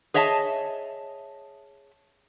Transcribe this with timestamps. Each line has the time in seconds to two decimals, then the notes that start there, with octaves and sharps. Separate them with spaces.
0.14 G#4 C#5 D#5 E5 A5